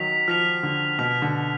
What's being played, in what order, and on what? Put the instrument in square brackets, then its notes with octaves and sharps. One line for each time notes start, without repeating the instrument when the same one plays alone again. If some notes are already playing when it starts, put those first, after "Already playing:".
Already playing: [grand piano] D#3 F#3 [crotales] B6 F7
[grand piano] F3 [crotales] F6 B6 F7
[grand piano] D3
[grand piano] B2 [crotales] F6 B6 F7
[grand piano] D3